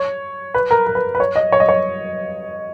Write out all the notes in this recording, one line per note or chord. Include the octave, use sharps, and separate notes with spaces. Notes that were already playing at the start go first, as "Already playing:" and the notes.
Already playing: C#5
B4
A#4
A#4
B4
B4
C#5
D#5
C#5
D#5
C#5